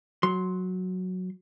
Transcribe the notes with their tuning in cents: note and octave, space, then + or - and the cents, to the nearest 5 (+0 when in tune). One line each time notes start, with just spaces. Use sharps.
F#3 -5 C6 +5